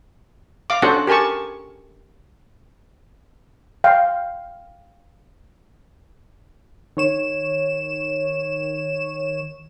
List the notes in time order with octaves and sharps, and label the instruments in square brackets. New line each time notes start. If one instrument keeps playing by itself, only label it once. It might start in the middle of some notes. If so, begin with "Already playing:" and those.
[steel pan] F5 D6
C#4 D4 F#4 A4 C5 F#5
G4 A#4 G#5 A5 C#6
F5 G5
[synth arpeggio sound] D#3 C#5 E7